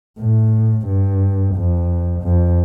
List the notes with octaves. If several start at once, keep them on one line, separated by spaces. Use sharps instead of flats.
A2
G2
F2
F2